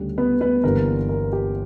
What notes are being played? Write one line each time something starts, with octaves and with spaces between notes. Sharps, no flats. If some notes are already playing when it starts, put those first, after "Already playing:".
Already playing: D2 C#3 G3
B3 B4
B3 B4
G1 G2 E3 G3 A#3 A#4
A#4
G4